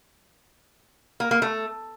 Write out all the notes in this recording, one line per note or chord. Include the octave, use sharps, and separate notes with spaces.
A#3
A#3
A3